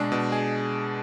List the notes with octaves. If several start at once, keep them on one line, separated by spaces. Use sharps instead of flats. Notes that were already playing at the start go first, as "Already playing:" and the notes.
Already playing: B2 G#3 D4 G#4
B2
G#4